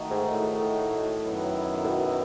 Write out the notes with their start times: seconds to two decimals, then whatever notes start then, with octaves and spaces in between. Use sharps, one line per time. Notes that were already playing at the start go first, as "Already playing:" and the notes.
Already playing: D#3 A3 D#4 F#4
0.11 G#2
0.33 A2
0.56 A2
1.21 F#2 D#3 F#3 B3 E4
1.84 A2
1.88 B2